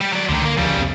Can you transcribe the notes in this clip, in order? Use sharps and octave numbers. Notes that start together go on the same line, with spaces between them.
G3
F#3 D5
C#2 D3 D#3 A3
D3 A#3
D#1 D2 C#3 F3 G3
C2 F2 B3